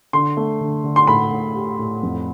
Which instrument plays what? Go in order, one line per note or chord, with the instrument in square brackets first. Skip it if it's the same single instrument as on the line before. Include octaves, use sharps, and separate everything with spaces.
[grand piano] D3 [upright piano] C6
[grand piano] A3
D3
D3
[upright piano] C6
[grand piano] A2 [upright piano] B5
[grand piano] A2
G4
A2
F2